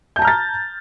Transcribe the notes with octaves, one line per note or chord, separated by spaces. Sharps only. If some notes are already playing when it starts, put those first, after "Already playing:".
A5 A#5 F6 G6 A6